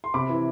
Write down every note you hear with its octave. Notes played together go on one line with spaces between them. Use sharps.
C6
C3 B5 D6
E3